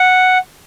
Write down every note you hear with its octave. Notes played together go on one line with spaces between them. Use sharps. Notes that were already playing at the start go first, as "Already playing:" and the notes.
Already playing: F#5